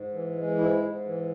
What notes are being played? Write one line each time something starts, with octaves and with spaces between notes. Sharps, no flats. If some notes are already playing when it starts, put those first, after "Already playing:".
Already playing: G#2
E3
G#3
G#2 E4
G#2
E3